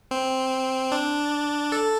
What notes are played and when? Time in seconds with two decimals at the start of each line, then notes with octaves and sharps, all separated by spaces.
0.11 C4
0.92 D4
1.72 A4